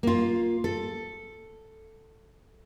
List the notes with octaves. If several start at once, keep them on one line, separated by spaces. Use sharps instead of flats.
A#3 F4
A4